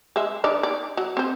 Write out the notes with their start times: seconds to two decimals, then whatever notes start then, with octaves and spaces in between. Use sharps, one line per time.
0.16 G#3 E5
0.44 D#3 D4 D5
0.63 D5
0.97 F#3
1.17 C4 C5